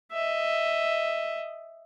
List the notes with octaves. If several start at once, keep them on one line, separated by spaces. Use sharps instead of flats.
D#5 E5